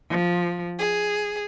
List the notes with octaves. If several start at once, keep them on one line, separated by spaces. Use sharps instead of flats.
F3
G#4